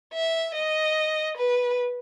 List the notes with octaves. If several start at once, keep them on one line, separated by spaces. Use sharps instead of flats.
E5
D#5
B4